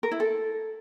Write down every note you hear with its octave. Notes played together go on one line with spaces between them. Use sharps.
A#4
E4
A4